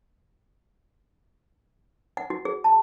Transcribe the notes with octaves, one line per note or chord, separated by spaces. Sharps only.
F#5
F#4
G#4
A5